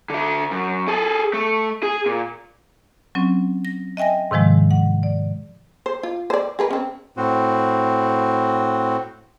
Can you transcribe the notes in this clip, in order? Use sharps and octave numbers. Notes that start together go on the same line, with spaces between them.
D3 E5
F#2
G#4 A4
A3
G#4
A#2
F#3 C4 C#4
A#6
D#5 E5 G5 G#5 A#6
G#2 C3 D#3 F3 G#3
F#5
D5
C5
F4
C5 D5
G#4 A#4 B4
C4 C#4
A2 C4 F#4